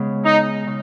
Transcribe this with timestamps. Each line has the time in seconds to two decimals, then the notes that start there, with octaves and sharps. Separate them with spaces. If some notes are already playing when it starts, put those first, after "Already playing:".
Already playing: C#3 G#3 B3
0.25 D#4
0.67 C#3